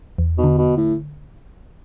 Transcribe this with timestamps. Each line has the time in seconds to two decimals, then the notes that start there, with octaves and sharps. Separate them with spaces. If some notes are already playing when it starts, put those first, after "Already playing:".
0.18 E2
0.38 B2
0.44 D3
0.58 B2
0.77 A2